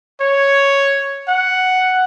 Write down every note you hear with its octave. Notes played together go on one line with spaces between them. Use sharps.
C#5
F#5